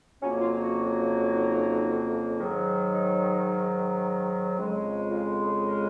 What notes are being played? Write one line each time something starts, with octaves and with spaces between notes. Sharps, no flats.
F2 C#3 F#3 A#3 C#4
F4
F#4
D#4
G#2 D#3 F#3
D#4
F2 C#3 G#3
F4
G#4
A#4